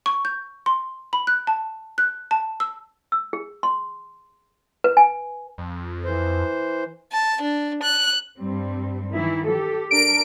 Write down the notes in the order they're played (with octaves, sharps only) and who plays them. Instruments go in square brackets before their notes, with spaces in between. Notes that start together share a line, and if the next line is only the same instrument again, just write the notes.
[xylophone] C#6
G6
C6
B5
F#6
A5
F#6
A5
E6
[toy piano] E6
G#4
C6
B4
G#5
[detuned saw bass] F2
[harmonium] E3 C5
[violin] A5
D4
F#6
[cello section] G2 G3 C4
D#3 E3 E4
G4 A4
[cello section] D4 A#4 [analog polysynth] D7